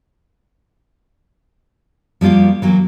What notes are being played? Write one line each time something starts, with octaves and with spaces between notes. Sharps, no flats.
F3 G3 A#3 F4 G4
E3 F#3 A#3